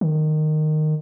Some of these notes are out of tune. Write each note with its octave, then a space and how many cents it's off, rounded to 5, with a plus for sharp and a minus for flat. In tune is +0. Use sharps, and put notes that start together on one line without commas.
D#3 -15